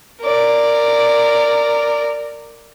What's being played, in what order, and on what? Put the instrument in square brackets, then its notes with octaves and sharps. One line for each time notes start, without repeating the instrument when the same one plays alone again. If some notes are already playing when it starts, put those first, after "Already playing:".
[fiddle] A#4 D5